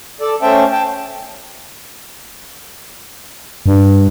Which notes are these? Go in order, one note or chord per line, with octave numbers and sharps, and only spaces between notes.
A4 D5
A3 C#4 C5 E5 G5 A5
G5 A5
G2